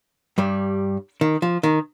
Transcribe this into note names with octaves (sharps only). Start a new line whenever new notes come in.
G2 G3
D#3
F3
D#3